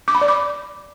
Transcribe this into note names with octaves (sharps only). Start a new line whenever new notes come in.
D6
B5
D5
D6